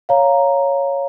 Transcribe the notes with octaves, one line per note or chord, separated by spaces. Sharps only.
C#5 F5 A#5